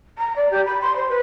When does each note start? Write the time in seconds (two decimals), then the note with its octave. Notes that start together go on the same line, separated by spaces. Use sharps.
0.18 A#5
0.36 D5
0.51 G4
0.65 B5
0.81 C6
0.96 C5
1.09 B4